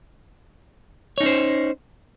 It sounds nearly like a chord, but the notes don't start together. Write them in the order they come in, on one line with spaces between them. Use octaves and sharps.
C#5 D#4 C#4 C5